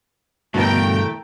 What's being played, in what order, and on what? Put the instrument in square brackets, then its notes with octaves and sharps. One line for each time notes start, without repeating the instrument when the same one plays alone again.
[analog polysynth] E2 A3 [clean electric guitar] G2 [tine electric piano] B2 D3 B3 [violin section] A#4 G5